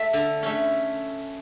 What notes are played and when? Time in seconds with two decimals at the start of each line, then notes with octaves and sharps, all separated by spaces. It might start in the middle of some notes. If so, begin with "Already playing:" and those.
Already playing: A3 E5
0.13 D3
0.43 A3 C#4